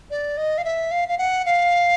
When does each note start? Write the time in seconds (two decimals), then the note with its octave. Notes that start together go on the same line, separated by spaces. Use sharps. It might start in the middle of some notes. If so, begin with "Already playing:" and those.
0.11 D5
0.37 D#5
0.58 F5
0.64 E5
0.91 F5
1.08 F5
1.18 F#5
1.46 F5